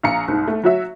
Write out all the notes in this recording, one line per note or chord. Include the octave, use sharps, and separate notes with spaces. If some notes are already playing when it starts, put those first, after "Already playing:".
A#1 F5 A#5 C#7
C2 G#2
A3
F#3 F#4 E5